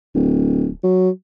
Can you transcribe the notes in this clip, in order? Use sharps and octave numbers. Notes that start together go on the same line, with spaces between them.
D1
F#3